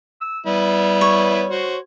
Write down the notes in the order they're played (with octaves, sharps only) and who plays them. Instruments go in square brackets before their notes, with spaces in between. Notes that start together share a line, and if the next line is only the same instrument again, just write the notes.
[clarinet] E6
[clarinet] G3 [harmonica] B3 E4
[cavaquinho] C#5
[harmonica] F#4 C5